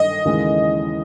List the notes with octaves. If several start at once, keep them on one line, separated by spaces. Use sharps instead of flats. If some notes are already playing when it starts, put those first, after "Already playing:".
Already playing: G2 D#3 D#5
D#2 C#3 E3 G#3